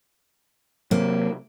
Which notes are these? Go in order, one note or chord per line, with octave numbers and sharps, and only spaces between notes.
C3 F#3 A#3